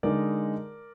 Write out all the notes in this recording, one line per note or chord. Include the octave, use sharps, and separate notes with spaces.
D3 G#3 D#4 A#4 D5